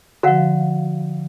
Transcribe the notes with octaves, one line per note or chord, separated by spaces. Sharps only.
D3 F3 F#4 F5 F#5